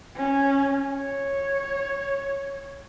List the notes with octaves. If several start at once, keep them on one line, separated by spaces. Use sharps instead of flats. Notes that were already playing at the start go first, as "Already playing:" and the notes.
C#4
C#5